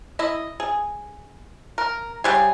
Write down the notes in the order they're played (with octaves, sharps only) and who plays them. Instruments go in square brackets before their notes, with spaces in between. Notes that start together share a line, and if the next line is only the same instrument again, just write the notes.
[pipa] E4 D#5
G#4
A#4
C#3 G3 G#4